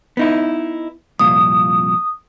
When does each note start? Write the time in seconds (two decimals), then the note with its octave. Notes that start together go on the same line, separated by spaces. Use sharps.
0.17 B3 D#4 E4
1.19 C2 F2 A#2 D#6